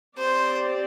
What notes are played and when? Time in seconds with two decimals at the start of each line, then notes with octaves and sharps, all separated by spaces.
0.18 C4 G4 C5 D5